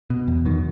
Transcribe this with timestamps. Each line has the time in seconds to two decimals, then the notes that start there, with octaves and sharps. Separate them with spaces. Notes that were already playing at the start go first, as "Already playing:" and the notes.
0.10 B2
0.27 E2
0.45 F#2 D#3